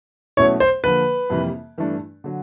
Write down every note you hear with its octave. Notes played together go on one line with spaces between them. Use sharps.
B2 F#3 A3 C#4 E4 C#5
C5
D3 F3 A#3 B4
F2 C3 E3 G3 A#3
G2 E3 A3 D4
D3 F#3